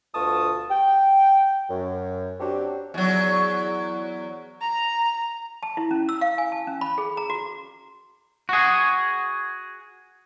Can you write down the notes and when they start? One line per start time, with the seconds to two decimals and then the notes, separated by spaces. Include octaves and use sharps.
0.15 D2 B2 F4 A5 C#6 D#6
0.70 G5
1.70 F#2
2.40 F#3 C4 D4 F#4 G4
2.94 E2 F#3
4.61 A#5
5.63 A5
5.77 E4
5.91 C#4
6.09 E6
6.21 F5
6.38 G#5
6.52 A5
6.67 C#4
6.81 B5
6.98 G#4
7.17 A#5
7.30 F#4
8.49 F#4 G#4